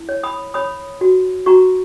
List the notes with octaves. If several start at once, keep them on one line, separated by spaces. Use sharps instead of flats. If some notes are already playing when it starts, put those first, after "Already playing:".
Already playing: E4
C#5
B5 D#6
C#5 B5 D#6
F#4
F#4 A#5 C#6